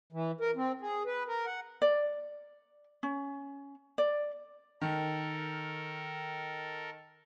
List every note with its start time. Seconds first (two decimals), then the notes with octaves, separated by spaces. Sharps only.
0.13 E3
0.41 A#4
0.56 C4
0.81 G#4
1.06 B4
1.28 A#4
1.46 F#5
1.82 D5
3.03 C#4
3.98 D5
4.81 D#3 A4 A#4